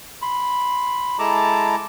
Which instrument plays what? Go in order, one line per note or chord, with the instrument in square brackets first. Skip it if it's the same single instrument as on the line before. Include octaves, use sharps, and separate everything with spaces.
[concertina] B5 C6
G#3 E4 A4 A5 A#5 D6